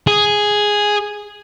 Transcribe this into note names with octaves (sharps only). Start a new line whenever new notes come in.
G#4